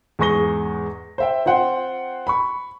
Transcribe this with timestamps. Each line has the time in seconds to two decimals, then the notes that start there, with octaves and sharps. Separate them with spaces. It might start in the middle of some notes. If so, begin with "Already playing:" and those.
0.19 E2 G#2 G#4 C#6 A#6 G7
1.18 C5 E5 G5
1.45 C4 F4 C5 F#5 G5 C6
2.27 B5 C#6